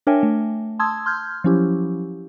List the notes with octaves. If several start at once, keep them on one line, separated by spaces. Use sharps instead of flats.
D4 A#4 C#5 E5 G5 G#5
A3
A5 C6 D#6 E6 G#6
C6 F6 G6 G#6
F3 F#3 C#4 E4 G4